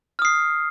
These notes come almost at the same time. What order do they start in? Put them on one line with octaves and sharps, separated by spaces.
F6 D#6 C7